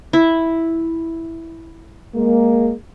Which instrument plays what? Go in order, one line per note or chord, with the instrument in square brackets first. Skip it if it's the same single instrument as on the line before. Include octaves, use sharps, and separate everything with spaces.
[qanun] E4
[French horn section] G#3 A#3